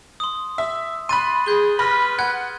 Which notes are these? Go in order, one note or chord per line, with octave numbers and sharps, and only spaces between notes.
C6 D#6
E5
B5 C6 F#6 A6 D#7
G#4 G6 G7
B4 B5 C6 F6 A#6
F#5 F#6 G#6